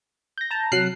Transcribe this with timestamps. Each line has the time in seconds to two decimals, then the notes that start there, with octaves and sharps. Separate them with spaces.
0.38 G6 A#6
0.51 A5 A#5
0.72 C3 F#3 F6 F#6 C7